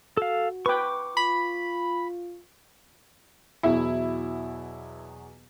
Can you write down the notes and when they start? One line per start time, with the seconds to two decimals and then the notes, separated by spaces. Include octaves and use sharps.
0.17 F#4 A4 F5
0.66 B4 G5 C#6 D6
1.17 F4 B5
3.63 E2 B2 F#3 E4